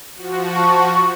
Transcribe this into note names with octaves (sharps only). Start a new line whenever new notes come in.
F3 F#4
A5 C#6